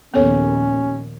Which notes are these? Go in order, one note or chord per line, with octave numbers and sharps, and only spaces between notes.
A#1 D#2 A#2 B3 C#4 A4 C#5